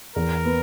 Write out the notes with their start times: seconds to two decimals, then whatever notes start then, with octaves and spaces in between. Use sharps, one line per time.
0.16 E2 A#4
0.45 B3